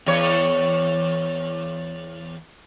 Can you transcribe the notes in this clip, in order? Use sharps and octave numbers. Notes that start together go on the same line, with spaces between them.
E2 C#5